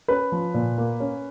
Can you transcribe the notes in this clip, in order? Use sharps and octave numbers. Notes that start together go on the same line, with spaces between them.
C#4 B4
F3
A#2
A#3
C#4